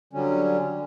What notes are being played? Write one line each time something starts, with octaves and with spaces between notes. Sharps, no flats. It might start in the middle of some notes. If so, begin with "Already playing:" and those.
D3 F#3 G3 C#4